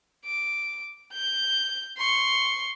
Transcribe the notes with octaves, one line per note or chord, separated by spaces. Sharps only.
D6
G6
C6 C#6